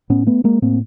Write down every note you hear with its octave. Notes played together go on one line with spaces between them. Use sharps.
A2 B3 C#4
A3 B3
G#3 A#3
A2 A#3 C4